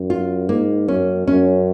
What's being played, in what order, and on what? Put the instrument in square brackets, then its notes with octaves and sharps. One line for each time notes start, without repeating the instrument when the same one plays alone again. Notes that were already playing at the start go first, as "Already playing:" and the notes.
Already playing: [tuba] F#2
[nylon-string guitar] F4
[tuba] G#2 [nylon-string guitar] A#3
[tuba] F#2 [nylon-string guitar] C#4
[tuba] F#2 [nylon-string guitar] C#4